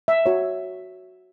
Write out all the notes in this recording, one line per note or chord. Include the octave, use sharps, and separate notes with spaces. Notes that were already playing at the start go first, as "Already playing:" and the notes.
E5
F#4 C#5